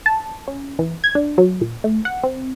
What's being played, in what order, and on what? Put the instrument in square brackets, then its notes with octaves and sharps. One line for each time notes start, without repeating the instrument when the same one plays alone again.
[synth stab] A5
C#4
E3
G#6
D4
F#3
A#2
A3
F#5
C4